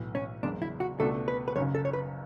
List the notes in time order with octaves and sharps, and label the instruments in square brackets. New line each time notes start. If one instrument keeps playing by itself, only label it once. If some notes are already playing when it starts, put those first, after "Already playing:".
Already playing: [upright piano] B1 A2 E3
[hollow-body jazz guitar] C#4
[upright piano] F#1 E2 C#3 G#3 [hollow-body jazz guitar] D4
[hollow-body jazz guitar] E4
F#4
[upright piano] C#2 B2 A3 D4 F#4 [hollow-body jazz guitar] A4
[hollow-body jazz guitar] B4
B4
[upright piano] F#1 F#2 C#3 [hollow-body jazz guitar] C#5
[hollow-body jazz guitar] A4
C#5
B4